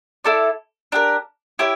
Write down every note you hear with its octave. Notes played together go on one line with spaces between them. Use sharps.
E4 A4 D5
D4 G4 A#4
E4 G4 C#5